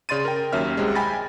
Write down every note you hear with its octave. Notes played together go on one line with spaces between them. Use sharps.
C#3 D5 C6 A6 D#7
A#4 G5
D#2 F#3 C#4 E5 F6
C2 C3 G#3
G5 G#5 B5 A6 A#6